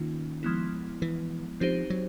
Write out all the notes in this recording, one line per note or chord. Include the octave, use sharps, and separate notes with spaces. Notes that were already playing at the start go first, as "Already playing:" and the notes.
Already playing: D#3 A#3 C#4 F4
F3 G#3 B3 E4
E3
F3 C4 D#4 G4 C5
F#3